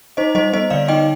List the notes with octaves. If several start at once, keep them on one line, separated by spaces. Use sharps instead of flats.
D#4 C5 D#5
G3 C5 D#5
B3 C5 D#5
D3 D5 F5
D#4 D#5 G5